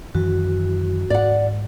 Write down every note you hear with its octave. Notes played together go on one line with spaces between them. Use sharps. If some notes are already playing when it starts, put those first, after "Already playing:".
F#2 D#3 E3 F#4
G#2 D5 F#5